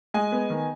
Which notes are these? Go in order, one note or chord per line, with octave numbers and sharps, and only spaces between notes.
G#3 D#5 G#5
B3
D#3